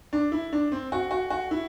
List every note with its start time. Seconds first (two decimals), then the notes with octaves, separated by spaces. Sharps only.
0.13 D4
0.32 E4
0.53 D4
0.72 C4
0.92 F#4
1.11 F#4
1.30 F#4
1.51 E4